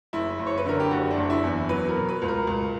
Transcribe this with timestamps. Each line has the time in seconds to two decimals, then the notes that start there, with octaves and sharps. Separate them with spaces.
0.13 F#1 E4
0.39 F#1
0.47 C#5
0.58 B4
0.65 D3 A#4
0.80 G4
0.91 F#1 F#4
1.11 D4
1.17 F#1
1.30 E4
1.44 E2
1.69 F#3 B4
1.88 A#4
1.95 B2
2.09 B4
2.22 C#2
2.28 A#4
2.47 C#2